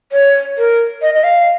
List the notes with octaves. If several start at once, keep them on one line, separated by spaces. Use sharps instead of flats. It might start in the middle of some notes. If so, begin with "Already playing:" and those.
C#5
A#4
D#5
D#5
F5